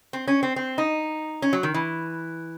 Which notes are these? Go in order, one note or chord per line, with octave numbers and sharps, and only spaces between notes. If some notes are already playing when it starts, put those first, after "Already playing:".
C4
C#4
C4
C4
D#4
C#4
F#3
D#3
E3